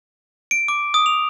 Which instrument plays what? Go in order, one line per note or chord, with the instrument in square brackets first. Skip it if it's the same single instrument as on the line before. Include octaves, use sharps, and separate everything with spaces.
[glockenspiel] D7
D6
D#6
F7